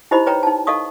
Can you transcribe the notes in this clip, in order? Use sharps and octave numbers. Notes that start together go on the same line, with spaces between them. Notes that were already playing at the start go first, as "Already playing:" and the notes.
D#4 E4 G4 C5 D#5 B5
B4 C#5 G5 A#5
D#4 A5
A4 D#5 F5 C#6 D#6